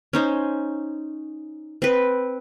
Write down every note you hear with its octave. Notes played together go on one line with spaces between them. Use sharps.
C#4 D#4 C5
C4 B4